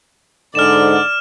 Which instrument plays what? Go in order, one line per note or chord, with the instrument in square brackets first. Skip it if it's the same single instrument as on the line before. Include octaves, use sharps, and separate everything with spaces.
[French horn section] G#2 D3 [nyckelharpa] D5 [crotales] F6 E7